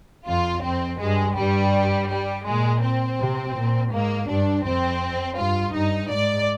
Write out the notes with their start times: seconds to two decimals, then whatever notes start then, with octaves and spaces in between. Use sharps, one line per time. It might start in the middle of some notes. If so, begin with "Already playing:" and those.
0.28 F2 F4
0.64 F2 C4
1.00 G2 G#3
1.37 G2 G3
2.09 G3
2.46 A#2 G#3
2.83 C4
3.20 C3
3.56 A#2
3.92 G#2 A#3
4.29 G2 D4
4.65 F2 C4
5.38 G2 F4
5.74 G2 D#4
6.11 G#2 D5